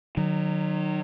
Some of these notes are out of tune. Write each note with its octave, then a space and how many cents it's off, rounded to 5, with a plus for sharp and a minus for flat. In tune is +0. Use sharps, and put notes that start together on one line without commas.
D#3 -30 F#3 +0